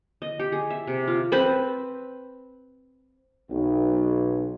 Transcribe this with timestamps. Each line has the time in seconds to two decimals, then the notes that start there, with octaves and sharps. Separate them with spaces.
0.22 D#5
0.39 G4
0.52 G#4
0.70 E5
0.87 C3
1.08 F4
1.32 C4 B4 B5
3.50 B1